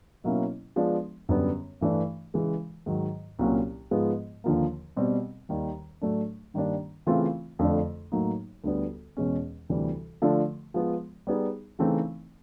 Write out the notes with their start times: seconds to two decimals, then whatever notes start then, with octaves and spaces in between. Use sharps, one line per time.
0.24 B2 F#3 A#3 C#4 E4
0.76 F3 G#3 B3 D4
1.29 F#2 D3 G3 B3
1.81 G2 E3 A3 D4
2.34 C#3 E3 G#3
2.86 G#2 D#3 F#3
3.39 C2 A#2 F#3 A#3 C#4
3.91 G#2 F3 G#3 B3
4.44 D#2 D3 F3 A#3
4.97 B2 G3 C4
5.49 D#2 D#3 G3
6.01 A2 F#3 A3 D4
6.54 G2 D#3 G3 A#3 D4
7.06 C#3 E3 A3 C4 F4
7.59 F2 D3 F3 A3 D4
8.12 A2 F#3 A#3 D#4
8.64 D2 D3 G3 B3
9.17 E2 B2 G#3 C#4
9.70 D2 C3 E3 G3
10.22 D3 F3 A3 D4
10.74 F3 G#3 B3
11.27 G3 B3 D#4 G#4
11.79 C#3 E3 A3 C4 D#4